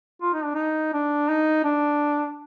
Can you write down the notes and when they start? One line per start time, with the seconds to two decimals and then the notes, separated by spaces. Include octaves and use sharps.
0.22 F4
0.33 D#4
0.44 D4
0.55 D#4
0.93 D4
1.29 D#4
1.64 D4